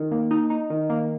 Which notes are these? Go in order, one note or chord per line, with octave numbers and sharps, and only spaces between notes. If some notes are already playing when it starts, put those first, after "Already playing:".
Already playing: D#3
A#3
D#4
D#4
D#3
A#3